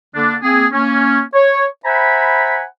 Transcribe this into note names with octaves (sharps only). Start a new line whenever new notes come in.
D3 A#3 D4
A#3 C4 G#4
A#3 C#4
C#5
C5 E5 F#5 G#5 A#5 B5